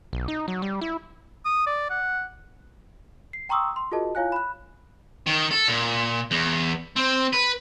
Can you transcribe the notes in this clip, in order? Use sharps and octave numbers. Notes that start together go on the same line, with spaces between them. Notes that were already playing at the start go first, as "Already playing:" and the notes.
B1
D#4
F#3
G3
E4
D#6
D5
F#5
C7
G5 A#5 C6 C#6 D#6 E6
C6
F4 F#4 G#4 A#4 D#5 A5
E4 F4 C#5 F5 G#5 F#6
B5 F#6
D#3
A4
A#2
E2
C4
B4